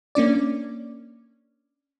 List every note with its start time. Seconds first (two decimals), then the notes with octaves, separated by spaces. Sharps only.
0.15 A#3 C#4 D4 D5